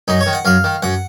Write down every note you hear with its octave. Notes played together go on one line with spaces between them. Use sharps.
F#2 D#4
C#5
D#3
F#5
F#2 F5
D#3
F#2 F#5